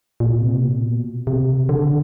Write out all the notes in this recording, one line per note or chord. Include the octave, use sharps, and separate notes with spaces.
A#2
C3
A#2
B2
C3
D3